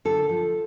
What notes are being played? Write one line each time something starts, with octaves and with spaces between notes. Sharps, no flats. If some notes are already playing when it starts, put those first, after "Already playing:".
D3 A4
F3